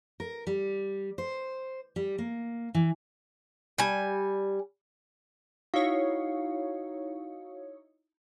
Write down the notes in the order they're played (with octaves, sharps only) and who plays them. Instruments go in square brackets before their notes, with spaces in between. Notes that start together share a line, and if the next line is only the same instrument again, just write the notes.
[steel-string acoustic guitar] A#4
G3
C5
G3
A#3
E3
[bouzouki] G3 G#5
[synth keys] D#4 E4 C#5 [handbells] F#4 F5